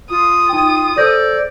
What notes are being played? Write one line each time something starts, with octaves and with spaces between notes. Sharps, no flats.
F4 D#6
D#4 G5
A4 C5 D5 G6 A#6